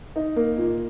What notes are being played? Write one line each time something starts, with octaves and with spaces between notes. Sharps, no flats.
D#4
A#3
A#2